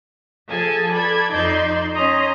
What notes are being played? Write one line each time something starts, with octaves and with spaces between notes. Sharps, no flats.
F3 G#4 A4 G#5 A5
A4 B4 D5 G#6
F2 D#4 D5 C6 E6 G6
C#4 D#5 A#5 C6